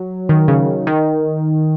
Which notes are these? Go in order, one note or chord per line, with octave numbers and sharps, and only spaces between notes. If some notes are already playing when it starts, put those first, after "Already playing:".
Already playing: F#3
D#3
C#3
D#3